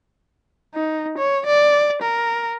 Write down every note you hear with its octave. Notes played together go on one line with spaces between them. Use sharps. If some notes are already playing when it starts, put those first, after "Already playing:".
D#4
C#5
D5
A#4